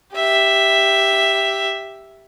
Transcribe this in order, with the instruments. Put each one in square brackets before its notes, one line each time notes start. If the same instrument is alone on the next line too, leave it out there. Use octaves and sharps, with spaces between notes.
[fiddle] G4 E5